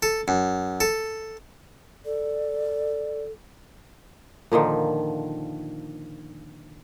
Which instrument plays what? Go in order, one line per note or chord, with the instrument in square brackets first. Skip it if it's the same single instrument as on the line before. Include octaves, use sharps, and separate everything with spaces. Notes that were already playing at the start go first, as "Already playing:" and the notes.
[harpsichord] A4
F#2
A4
[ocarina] A4 [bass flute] D5
[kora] A#2 D3 D#3 F3